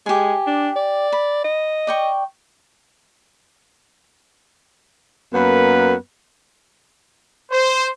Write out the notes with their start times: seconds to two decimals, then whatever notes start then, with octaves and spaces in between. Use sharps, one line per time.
0.06 G#3 G4 G#5
0.47 D4
0.76 D5
1.12 B5
1.44 D#5
1.87 D5 G5 C#6
5.34 F#2 A#3 B3 B4
7.52 C5